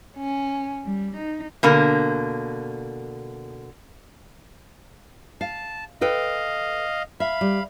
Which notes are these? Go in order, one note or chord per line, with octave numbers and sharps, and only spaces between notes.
C#4
G3
D#4
B2 D3 A#3
F5 A5
A4 B4 D#5 F5 G5
E5 F5 B5
G3